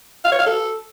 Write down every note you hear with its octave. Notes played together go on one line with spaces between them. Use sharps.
F5
C#5
F5
A4